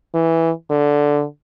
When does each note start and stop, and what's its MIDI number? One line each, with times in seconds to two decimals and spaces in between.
0.15 0.50 52
0.70 1.24 50